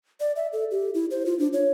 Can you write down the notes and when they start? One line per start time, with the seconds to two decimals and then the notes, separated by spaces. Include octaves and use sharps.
0.20 D5
0.36 E5
0.53 A4
0.71 G4
0.94 E4
1.11 C5
1.26 F4
1.39 D4
1.53 C#5